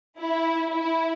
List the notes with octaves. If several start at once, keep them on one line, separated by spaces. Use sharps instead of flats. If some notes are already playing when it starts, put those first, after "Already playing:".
E4
E4